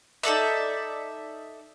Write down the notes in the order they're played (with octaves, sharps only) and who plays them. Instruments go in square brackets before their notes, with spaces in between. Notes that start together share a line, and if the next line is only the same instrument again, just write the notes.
[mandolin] D#4 A4 D5 E5